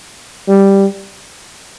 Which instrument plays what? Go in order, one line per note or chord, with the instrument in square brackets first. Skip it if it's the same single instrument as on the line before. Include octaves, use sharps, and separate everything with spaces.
[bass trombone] G3